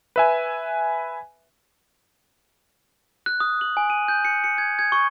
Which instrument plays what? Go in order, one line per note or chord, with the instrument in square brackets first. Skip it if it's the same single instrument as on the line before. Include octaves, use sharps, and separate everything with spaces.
[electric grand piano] B4 E5 G#5
[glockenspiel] F#6
D#6
F#7
G#5
D#7
G6
C#7
C#7
G#6
G#6
C#6